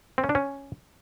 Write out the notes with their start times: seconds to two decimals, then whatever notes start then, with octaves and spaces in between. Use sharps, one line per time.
0.18 C4
0.24 C#4
0.29 D4
0.35 C#4